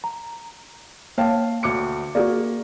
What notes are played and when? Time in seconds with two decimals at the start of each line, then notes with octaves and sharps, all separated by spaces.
0.04 A#5
1.18 A#3 C#5 F5 G5 A5
1.63 D2 D6 C#7
2.15 A#3 F#4 G#4 D5